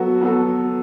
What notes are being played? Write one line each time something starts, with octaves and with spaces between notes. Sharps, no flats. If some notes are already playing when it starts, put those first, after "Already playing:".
Already playing: F#3 B3 F#4 A4
F#3 B3 F#4 A4